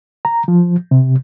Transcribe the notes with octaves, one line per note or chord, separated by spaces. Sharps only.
A#5
F3
C3